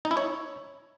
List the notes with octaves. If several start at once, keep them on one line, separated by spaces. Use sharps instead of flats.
D#4
E4
C#5